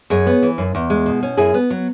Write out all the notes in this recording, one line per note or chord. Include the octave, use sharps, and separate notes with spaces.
F#2 G#4 C#5
B3
E3
F#2
E2
G#3
B2
C#4
F#2 E4 G#4
B3
F#3